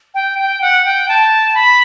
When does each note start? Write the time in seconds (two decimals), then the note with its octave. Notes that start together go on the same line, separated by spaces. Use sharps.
0.14 G5
0.39 G5
0.62 F#5
0.85 G5
1.09 A5
1.55 B5